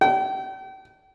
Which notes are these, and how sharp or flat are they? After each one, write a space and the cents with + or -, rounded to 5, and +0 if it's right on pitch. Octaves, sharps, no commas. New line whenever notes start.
G5 -40